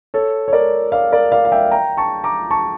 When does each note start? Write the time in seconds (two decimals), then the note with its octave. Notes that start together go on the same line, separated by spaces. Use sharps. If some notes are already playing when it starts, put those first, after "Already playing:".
0.14 A4 C#5
0.48 C#5
0.53 A#4 D5
0.92 D5 F5
1.12 A#4 D5
1.32 D5 F5
1.45 F5
1.52 E5 G5
1.72 G5 A#5
1.97 A5 C#6
2.24 A#5 D6
2.51 A5 C#6